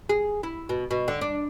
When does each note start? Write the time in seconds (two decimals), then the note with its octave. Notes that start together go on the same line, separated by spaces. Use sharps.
0.09 G#4
0.43 E4
0.69 B2
0.91 B2
1.08 D3
1.21 D4